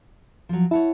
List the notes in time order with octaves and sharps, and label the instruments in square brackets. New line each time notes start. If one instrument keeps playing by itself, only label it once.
[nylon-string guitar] F3 F#3
[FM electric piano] E4 [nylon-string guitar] C#5 F#5 A5